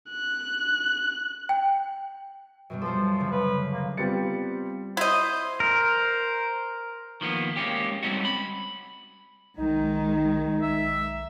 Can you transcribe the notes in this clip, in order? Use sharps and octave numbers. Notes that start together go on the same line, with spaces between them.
F#6
G5
F#2 B2 G3
F3 A4 C5
D2 C#3
B4
A#3
G3 B3 C4 F4 A6 C#7
E4 C5 D#5
A#4 C5
D#3 F3 A#3 B3
G#3 A#3 C#4 G4
G3 G#3 C4 C#4 D#4 F#4
B5
B1 D#3 G#3 D#4
B1 E5